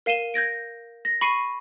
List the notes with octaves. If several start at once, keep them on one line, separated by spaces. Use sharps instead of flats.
A#4 F5 D#7 E7 G7
G6 G#6 A#6 D7
A#6
B5 C#6 C7 C#7 D#7